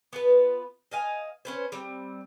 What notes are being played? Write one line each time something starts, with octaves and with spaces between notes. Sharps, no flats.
B3 F4 B4
D#5 F5 G#5
C#4 B4 C5
G3 C4